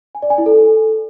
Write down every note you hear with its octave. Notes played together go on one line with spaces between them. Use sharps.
G#5
D5
G#5
E4
A4